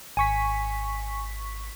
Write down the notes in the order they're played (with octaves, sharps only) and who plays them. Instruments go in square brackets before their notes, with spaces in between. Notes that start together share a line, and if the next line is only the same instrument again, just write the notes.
[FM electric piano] G#1 C#6 B6 [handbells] G#5